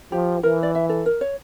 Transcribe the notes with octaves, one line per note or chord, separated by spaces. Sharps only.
F3 G4
E3 A#4
D5
E5
A4
A#4
C#5